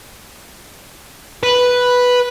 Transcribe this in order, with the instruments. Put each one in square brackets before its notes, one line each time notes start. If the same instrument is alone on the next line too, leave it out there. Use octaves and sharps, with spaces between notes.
[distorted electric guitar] B4